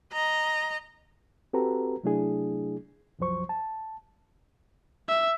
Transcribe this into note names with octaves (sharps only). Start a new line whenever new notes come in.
D#5 A#5
C4 F#4 G4 A4 B4 A#5
C3 F#3 A3 D4 E4 G#4
C2 F#2 F3 F#3 C5 C#6
A5
E5